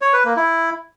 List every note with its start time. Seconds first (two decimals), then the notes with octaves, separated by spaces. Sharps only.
0.02 C#5
0.13 B4
0.25 A#3
0.37 E4